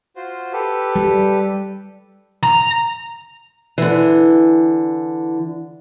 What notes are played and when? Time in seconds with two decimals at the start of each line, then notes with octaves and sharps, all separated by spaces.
0.16 F4 F#4 C5
0.53 G4 A4 B4
0.96 G3
2.43 A#5
3.78 D3 E3